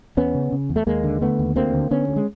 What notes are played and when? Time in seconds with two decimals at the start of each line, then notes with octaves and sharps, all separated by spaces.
0.17 E2 B3 C#4
0.35 C#3
0.52 C#3
0.69 E2
0.76 A3
0.86 D#2 G#3 A#3
1.04 D3
1.21 D3 A3 B3
1.39 D#2
1.56 D2 A#3 C4
1.74 D3
1.91 D3 B3 C#4
2.09 D2
2.16 G#3